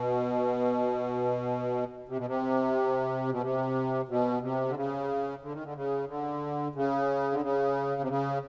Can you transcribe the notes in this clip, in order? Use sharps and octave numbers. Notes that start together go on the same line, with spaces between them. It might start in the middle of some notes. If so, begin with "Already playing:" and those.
Already playing: B2
C3
B2
C3
B2
C3
B2
C3
D3
C#3
D3
D#3
D3
C#3
D3
C#3
D3
C#3
C3
C#3